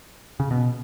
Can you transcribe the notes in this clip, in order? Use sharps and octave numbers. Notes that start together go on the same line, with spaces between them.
C#3
B2